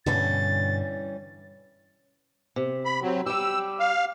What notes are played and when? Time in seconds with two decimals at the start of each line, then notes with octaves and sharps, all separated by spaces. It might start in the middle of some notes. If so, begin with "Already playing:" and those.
0.06 G2 B2 D3 E3 G3 C#4 A6
2.56 C3
2.85 B5
3.02 F#3 C4
3.26 G3 G4 E6
3.80 F5